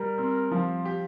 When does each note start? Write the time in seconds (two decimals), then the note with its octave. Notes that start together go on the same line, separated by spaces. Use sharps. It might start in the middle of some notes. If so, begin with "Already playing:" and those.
Already playing: G3 A#4
0.18 C4
0.51 F3
0.85 G4